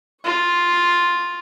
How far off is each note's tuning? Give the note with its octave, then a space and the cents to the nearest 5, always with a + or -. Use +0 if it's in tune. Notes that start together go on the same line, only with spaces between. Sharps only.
F4 +0 C#6 +0